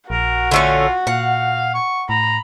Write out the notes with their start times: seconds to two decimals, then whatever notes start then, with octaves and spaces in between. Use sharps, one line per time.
0.10 A#1 F#4 A#4
0.51 D3 A3 C#4 F4
1.07 A#2 F5 F#5
1.74 C#6
2.09 A2 A#5 B5